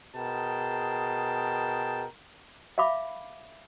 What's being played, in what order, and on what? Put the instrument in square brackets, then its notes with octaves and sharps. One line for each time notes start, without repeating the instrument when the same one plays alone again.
[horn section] B2 G#4 A#4 G5 A5
[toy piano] E5 F5 B5 D6